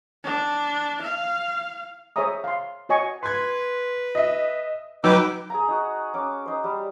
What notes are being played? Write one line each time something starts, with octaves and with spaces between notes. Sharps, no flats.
D4
F5
G#4 C5 C#5 E5 A#5 D#6
F5 C6
F#4 C#5 D#5 G#5 C#6
B4 C6 G#6
D#5 E5
F#3 D#4 B4 G5 D6 E6
G#4 G#5 A#5
D#4 F#4
C#4 D6
D#4 C5
G3